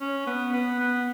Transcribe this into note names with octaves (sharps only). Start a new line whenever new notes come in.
C#4
B3
B3
B3